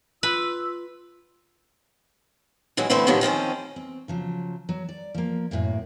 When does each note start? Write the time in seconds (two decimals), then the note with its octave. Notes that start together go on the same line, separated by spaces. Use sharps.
0.23 F4 B4 E6
2.77 D#3 E3 F#3 G#3
2.90 D3 E3 A3 B3 C4 C5
3.07 A2 C3 D#3 F3 F#3
3.21 D#3 F3 C4 C#4
3.76 C4
4.08 C#3 F3 F#3
4.69 F#3
4.89 D5
5.14 F3 A#3
5.51 F#2 A2 C3 A#3